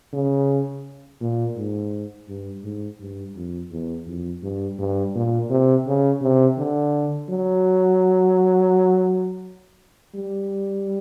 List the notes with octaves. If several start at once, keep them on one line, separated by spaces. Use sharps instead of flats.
C#3
A#2
G#2
G2
G#2
G2
F2
E2
F2
G2
G2
A#2
C3
C#3
C3
D3
F#3
G3